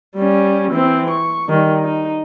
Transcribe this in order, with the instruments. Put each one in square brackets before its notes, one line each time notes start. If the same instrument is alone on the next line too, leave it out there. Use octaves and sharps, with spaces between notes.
[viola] G3 C#4
E3 C4
C#6
D#3 G3
D#4